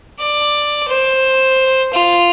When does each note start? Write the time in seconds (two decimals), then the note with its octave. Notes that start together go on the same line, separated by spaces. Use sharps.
0.20 D5
0.89 C5
1.93 F4